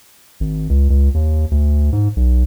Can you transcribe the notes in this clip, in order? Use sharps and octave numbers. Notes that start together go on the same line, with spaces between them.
G#1
C#2
C#2
D#2
D2
G#2
B1